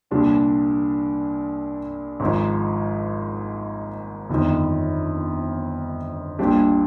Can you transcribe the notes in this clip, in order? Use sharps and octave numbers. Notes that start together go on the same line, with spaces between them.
C2 A#2 G3 D4
G#1 G#2 F3
G1 F2 D#3
A#1 A#2 G3 D4 G4